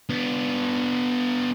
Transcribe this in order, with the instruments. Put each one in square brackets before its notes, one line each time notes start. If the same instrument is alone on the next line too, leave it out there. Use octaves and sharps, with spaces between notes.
[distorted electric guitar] B3 D4